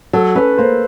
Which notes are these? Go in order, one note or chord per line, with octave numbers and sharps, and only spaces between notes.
F#3 A4
C#4 B4
A#3 C5